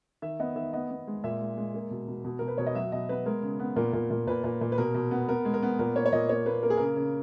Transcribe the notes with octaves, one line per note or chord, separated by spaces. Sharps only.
D#3 E5
B3 D#5
D#3 E5
B3 D#5
B3
G#3
A#2 E5
G#3
G#3
A#3
B2
B2
B2
B2 A#4
B4
B2 C#5
D#5
F#3 E5
B2 D#5
B3 B4
G#3 A#4
C#3
B3
A#2 A#4
A#2
A#2
A#2 B4
A#2
A#2
B4
B2 A#4
B2
B3
B3 A#4
G#3
A#4
B3
A#2 A#4
A#3 C#5
C#5
A#2 D#5
A#3 C#5
A#3 B4
A#3 A#4
G#4
C#3 A#4
C#3